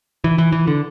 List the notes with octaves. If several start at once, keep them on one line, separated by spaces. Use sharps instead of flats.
E3
E3
E3
D3